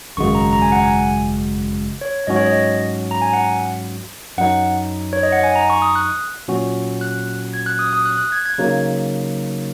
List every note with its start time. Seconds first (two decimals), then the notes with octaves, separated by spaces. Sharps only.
0.17 G#1 F#2 C#3 G#3 F#4 C#6
0.35 A#5
0.53 A#5
0.62 G#5
0.72 F#5
0.82 G#5
2.01 C#5
2.27 G#2 F#3 C#4 F#4 D#5
2.36 C#5
2.45 D#5
3.11 A#5
3.22 G#5
3.33 F#5
4.38 F#2 F#3 D#4 F#5
5.13 C#5
5.23 D#5
5.32 F#5
5.44 G#5
5.56 A#5
5.70 C#6
5.82 D#6
5.95 F#6
6.48 A#2 F#3 C#4 F#4
7.01 F#6
7.54 G#6
7.66 F#6
7.79 D#6
7.93 D#6
8.06 F#6
8.18 F#6
8.32 G#6
8.46 G#6
8.58 C#3 F#3 A#3 D#4